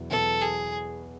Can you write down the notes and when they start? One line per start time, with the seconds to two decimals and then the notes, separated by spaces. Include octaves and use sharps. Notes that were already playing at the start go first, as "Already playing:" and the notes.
Already playing: E2 B2 F#3 B3 E4
0.10 E2 B2 F#3 B3 E4 A4
0.41 G#4